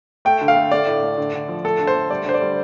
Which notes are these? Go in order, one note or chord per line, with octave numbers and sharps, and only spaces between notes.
A3 G5
D3
F5
A3
A3 D5
A2
A3
D3
D3
F3
A3 A4
D3
C5
A3
G3 D5
D3 C5
D5
G3